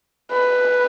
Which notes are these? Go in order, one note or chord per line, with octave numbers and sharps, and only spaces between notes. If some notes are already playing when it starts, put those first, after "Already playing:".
B4